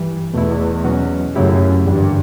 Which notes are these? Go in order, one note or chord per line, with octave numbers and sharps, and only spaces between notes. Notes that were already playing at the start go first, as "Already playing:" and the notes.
Already playing: G2 E3 G3
E2 B2 A3 E4
B2 F#3 C#4 F#4
F#2 C#3 F#3 A3 E4 G4
E2 G2 D3 G3